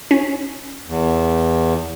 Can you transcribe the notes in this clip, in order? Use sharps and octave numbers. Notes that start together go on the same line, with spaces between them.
C#4
E2